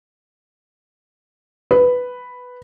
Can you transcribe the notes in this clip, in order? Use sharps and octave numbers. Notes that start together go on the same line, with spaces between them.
B4